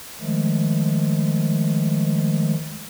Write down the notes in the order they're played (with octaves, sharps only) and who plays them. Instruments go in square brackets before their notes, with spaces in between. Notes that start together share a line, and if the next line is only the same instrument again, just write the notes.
[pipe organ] D#3 F3 G#3 A3